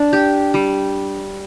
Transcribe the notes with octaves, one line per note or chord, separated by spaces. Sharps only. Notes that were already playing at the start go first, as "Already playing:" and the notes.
Already playing: D4
G4
G3